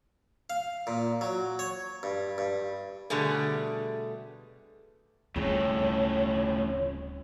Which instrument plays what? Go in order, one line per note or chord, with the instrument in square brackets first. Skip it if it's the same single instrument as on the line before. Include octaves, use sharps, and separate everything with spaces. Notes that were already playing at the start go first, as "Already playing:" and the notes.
[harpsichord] F5
A#2
F#3
C#5
G2
G2
[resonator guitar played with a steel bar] B2 D3 G3 A3 G#4
[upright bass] D1 G3 [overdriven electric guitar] F2 A2 [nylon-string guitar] C#3 [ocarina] C#5